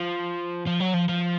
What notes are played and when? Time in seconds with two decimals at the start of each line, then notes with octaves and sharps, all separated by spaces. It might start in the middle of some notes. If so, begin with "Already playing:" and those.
Already playing: F3
0.67 F3
0.80 F#3
0.94 F3
1.09 F3